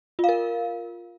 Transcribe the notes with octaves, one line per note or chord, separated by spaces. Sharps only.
F4 A#4 F5